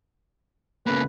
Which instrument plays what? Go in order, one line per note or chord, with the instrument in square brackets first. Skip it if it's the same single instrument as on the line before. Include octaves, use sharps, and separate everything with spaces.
[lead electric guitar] C#2 A#3 [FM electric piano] B3 C#4 A4 [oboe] B4